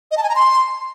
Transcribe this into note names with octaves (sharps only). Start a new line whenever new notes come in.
D#5
A5
G#5
A#5
C6